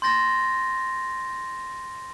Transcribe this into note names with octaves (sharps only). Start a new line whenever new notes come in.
C6 G6 A6 A#6